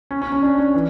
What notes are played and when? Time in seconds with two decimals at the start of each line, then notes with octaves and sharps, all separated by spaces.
0.11 C#4
0.22 C#4
0.32 C#4
0.43 D4
0.59 C#4
0.74 E3